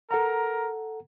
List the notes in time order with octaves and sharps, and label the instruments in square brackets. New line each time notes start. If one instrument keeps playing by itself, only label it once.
[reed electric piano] A4 F#5 A#5 [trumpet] A#4